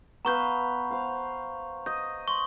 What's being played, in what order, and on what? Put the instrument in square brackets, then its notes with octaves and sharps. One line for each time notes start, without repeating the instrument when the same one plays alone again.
[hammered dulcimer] B3 B4 F5 [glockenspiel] A#5 C#6 G6
[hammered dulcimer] C5 F5
[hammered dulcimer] D#5 [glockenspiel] G6
[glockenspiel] C6 C#6